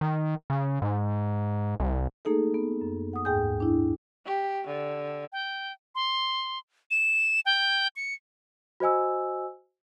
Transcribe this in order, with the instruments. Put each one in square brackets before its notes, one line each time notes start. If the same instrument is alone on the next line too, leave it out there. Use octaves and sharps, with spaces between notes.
[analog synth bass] D#3
C#3
G#2
C2
[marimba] A3 A#3 D#4 G#4 A4
B3
F#2
F#5 D#6
D#2 G#2 G#4 G5 G#5 G6
D4 E4
[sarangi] G4
D3
[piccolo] G5
C6
E7
G5
C#7
[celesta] F#4 C5 D#5 G#5 E6